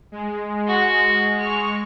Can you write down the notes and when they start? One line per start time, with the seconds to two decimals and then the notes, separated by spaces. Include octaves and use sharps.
0.12 G#3
0.67 F#4
1.39 G#3 C#6 F6